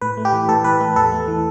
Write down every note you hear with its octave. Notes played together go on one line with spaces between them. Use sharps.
A2 B4
A3
G4
E3
A2 A4
A2 B4
A3 A4
E2 A4
A3
E3